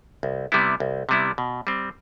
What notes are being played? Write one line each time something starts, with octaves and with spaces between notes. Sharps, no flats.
C2
C3 G3 B3 E4
C2
C3 G3 B3 E4
B2
G3 C4